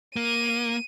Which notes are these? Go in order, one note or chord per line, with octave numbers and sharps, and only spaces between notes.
A#3 D#7